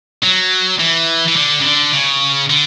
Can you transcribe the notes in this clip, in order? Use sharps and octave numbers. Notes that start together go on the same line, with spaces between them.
F#3
E3
E3
D3
C#3
D3
C#3
D3